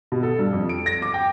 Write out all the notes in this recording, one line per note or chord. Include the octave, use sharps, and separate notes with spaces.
B2
A4
G2
F2
D7
A#6
D6
G5